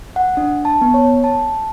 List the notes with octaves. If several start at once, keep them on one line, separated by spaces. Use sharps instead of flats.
F#5
D4
A5
B3
C#5
A5